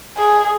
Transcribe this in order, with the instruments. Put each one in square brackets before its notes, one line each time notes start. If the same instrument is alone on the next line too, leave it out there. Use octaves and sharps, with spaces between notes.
[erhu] G#4